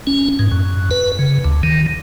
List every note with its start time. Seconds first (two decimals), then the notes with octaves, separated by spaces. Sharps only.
0.07 C#4
0.39 G#2
0.52 F#2
0.91 B4
1.19 C#3
1.45 D2
1.63 D#3